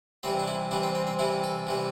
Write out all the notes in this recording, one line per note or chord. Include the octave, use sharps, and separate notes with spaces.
C3 E3 G3 C4
D4
E4
C3 E3 G3 D4
C4
C4
C4
C3 E3 G3 E4
A4
C3 E3 G3